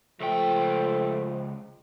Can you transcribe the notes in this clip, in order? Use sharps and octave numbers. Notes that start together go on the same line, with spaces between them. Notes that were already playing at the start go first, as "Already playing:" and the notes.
C#2 F3 A3 G5